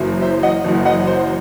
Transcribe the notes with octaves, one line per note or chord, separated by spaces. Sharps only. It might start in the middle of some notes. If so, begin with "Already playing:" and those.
Already playing: F#1 F#2 E3
C5 E5
D#5 F#5
F#1 F#2 E3
D#5 F#5
C5